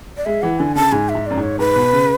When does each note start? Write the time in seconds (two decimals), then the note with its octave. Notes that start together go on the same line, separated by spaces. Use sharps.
0.17 D5
0.25 G#3 E5
0.42 E3 F#5
0.59 D3 G#5
0.75 C#3 A5
0.92 G#2 G#5
1.09 E5
1.15 G#2
1.26 F#2 D5
1.37 G#2
1.43 C#5
1.59 G#2 B4
1.76 B2
1.93 C#3